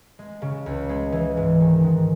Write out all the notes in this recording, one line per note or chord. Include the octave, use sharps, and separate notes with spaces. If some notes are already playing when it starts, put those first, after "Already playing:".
G#3
C#3
C#2
G#3
E3
G#2
D#3
G#2